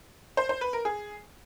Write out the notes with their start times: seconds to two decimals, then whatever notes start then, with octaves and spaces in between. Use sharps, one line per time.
0.37 C5
0.49 C5
0.61 B4
0.73 A#4
0.85 G#4